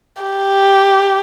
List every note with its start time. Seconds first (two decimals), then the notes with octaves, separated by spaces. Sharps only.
0.22 G4